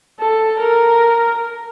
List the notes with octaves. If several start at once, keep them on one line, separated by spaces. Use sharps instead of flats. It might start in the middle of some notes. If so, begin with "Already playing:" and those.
A4
A#4